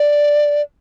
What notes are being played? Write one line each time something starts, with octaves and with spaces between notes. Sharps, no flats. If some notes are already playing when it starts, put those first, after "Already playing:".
Already playing: D5